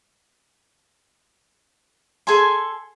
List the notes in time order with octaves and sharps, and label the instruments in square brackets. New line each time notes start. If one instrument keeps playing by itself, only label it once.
[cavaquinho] G#4 A4 G#5 C6